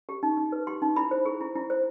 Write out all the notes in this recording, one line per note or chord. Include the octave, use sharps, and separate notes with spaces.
G4
D#4
D#4
B4
G4 C6
D#4
E4 B5
C5
G#4
E4
E4
C5